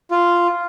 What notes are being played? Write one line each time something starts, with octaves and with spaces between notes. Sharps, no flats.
F4